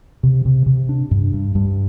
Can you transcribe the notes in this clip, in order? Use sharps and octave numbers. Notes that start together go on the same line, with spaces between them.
C3
C3
C3
D4
G2
G2
G2